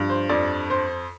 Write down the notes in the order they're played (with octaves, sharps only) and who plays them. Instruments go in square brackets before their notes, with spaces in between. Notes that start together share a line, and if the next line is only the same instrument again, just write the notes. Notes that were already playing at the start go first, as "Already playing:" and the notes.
Already playing: [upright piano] G2 F3
C5
F2 D5
C5